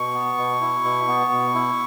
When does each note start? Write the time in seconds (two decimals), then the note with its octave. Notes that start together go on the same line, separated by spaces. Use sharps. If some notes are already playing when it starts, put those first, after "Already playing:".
Already playing: B2 C#6
0.14 B3
0.37 B2
0.61 E4
0.84 B2
1.08 B3
1.32 B2
1.54 E4